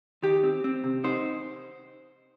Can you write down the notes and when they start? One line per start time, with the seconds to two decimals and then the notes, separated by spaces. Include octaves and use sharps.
0.23 D#3 G4
0.43 C4
0.64 C4
0.84 C3
1.04 D#4 C5